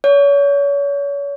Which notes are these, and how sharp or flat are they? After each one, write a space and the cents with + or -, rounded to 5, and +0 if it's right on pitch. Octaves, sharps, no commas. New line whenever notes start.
C#5 +35